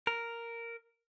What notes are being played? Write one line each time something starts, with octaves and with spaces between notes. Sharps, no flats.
A#4